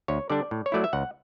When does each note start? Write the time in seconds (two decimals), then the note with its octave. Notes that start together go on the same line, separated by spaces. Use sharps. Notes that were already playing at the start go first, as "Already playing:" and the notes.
0.08 D2 C#5
0.30 D3 G3 D4 D5
0.51 A2
0.66 C#5
0.72 F#3 A3 E4 D5
0.84 E5
0.93 C#2 F#5